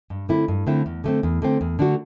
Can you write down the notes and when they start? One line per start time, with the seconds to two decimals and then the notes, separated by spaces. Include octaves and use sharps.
0.10 G2
0.29 D3 A3 C4 E4
0.48 G2
0.67 D3 A3 C4 E4
0.86 E2
1.04 D3 A3 C4
1.23 E2
1.42 D3 A3 C4
1.61 E2
1.79 D3 A3 D4 F#4